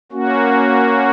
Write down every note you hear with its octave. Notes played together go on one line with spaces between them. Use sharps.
A#3 C#4 F#4